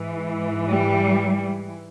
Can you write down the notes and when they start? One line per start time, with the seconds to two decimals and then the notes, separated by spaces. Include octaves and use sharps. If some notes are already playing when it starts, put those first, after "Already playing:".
Already playing: G#2 E3
0.68 G3